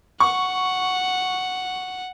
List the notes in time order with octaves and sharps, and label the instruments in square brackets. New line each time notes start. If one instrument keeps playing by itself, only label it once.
[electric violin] F#5 [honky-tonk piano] C#6